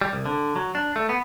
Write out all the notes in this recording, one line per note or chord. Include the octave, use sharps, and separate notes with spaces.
G3
C2
D3
F#3
D4
A3
B3